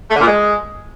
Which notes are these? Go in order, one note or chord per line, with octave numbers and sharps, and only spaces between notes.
A3
D3
A#2
G#3